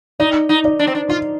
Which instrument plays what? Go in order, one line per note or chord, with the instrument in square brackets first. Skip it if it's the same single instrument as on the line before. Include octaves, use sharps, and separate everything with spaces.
[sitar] D#4 [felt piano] D5
[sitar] D#4
[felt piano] D5
[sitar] D4
C4
D4
[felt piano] D#4 [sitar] F4